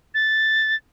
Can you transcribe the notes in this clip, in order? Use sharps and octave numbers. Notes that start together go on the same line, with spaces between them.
A6